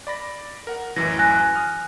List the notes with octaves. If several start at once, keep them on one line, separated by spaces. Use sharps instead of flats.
D5 B5 A#6
A#4 F#5
A1 F#2 E3 A#6
G#5 F#6 A#6
D#6 F6